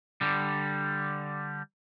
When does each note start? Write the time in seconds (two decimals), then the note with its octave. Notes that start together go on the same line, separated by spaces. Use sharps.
0.21 D3 G3